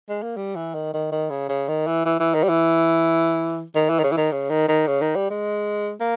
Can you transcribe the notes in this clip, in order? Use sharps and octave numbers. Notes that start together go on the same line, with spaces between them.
G#3
A#3
G3
E3
D#3
D#3
D#3
C#3
C#3
D#3
E3
E3
E3
D#3
G3
E3
D#3
E3
D#3
C#3
E3
D#3
C#3
D#3
D#3
C#3
D#3
G3
G#3
A#3